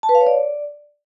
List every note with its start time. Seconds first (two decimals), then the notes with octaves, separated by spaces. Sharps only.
0.03 A5
0.09 B4
0.15 F5
0.21 C#5
0.27 D5